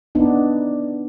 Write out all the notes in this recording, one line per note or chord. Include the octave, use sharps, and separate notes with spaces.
B3 D4 D#4